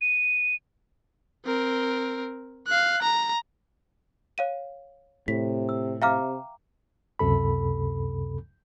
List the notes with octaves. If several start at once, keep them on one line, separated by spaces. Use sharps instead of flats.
D#7
C4 A#4
F5 F#6
A#5
C#5 F5 D#7
A2 C3 B6
E6
C3 E5 F5 G5 A#5 D6 F6
C#2 F#2 C3 A4 B5